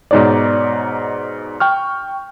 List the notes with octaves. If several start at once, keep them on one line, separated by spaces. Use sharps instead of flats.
G#2 B2 D#4 C#5 D5
G5 C#6 F6